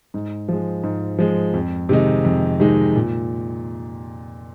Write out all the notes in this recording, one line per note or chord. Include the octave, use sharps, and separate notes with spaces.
G#2
F3 G#3
G#2
F3 G#3
F2
C3 D#3 G#3 D#4
F2
C3 D#3 G#3 D#4
A#2